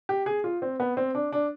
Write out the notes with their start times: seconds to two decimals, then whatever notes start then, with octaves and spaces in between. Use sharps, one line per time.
0.09 G4
0.26 G#4
0.44 F4
0.62 C4
0.80 B3
0.97 C4
1.15 D4
1.32 D4